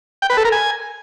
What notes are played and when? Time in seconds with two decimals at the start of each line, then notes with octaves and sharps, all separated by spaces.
0.22 G5
0.30 B4
0.37 A4
0.45 A#4
0.52 G#5